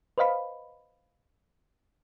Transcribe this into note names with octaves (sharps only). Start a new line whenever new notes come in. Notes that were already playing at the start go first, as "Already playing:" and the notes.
B4 C5 D#5 F5 B5